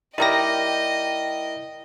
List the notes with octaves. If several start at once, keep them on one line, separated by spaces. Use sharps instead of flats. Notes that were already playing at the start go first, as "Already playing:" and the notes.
G3 D#4 E4 G4 A#4 D#5 G5 A#6